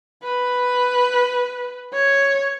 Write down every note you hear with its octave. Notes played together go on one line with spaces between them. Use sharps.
B4
C#5